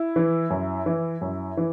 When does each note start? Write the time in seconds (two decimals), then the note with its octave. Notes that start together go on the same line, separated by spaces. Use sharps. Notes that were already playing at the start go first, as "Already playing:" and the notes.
Already playing: E4
0.16 E3
0.50 F#2
0.86 E3
1.21 F#2
1.57 E3